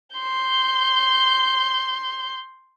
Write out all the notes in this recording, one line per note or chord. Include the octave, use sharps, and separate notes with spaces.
C6 G6